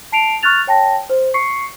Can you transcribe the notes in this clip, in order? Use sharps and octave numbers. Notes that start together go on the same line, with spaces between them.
A5 C7 D7 F7
C#6 F6 F#6 A6 F7
C#5 G5 A5 A#6
C5
C#6 C7 C#7